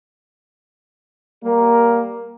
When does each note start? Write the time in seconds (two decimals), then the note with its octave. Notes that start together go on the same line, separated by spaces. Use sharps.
1.44 G3 A#3 A#4